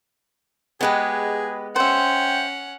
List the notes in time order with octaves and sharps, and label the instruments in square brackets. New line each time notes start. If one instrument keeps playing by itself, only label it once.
[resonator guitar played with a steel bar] G#3 B3 [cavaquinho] G4 B4 D#5 [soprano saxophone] G#4
[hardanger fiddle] C#4 F#5 [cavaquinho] C5 E5 [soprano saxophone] G5